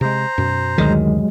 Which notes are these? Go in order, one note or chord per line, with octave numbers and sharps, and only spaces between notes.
C3 G#3 C5 A#5
F#2 B2
D2 D#3 F#3 G#3